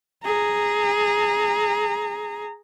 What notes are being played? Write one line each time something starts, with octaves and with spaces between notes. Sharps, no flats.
G#4 A#5